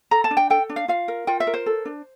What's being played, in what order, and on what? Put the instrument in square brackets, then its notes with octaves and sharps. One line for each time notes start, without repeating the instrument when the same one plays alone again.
[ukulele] A4 A#5
A5
D4
G5
A4 G5
D4
F5
F4 F5
A#4
F4 G5
E5
A#4
C5
A4
D4